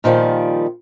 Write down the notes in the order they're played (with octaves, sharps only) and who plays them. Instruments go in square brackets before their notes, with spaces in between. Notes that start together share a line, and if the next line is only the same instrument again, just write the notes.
[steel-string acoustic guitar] A#2 D#3 F3 G3